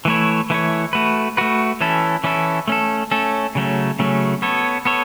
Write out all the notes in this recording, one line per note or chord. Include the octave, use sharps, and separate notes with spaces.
E3 A3 E4 C#5
E3 A3 E4 C#5
A3 F#4 B4
A3 F#4 B4
E3 C#4 E4 A4
E3 C#4 E4 A4
A3 C#4 A4
A3 C#4 A4
C#3 F#3 A3 C#4
C#3 F#3 A3 C#4
B3 A4 C#5
B3 A4 C#5